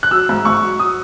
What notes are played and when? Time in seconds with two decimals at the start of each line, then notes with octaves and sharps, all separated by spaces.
0.03 F#6
0.11 F#3 E6
0.29 G#2
0.45 G#2 C#6
0.62 F#3
0.79 F#3 D#6